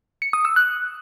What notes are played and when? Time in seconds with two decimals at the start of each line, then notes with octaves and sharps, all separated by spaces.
0.22 C#7
0.33 D#6
0.45 E6
0.56 F#6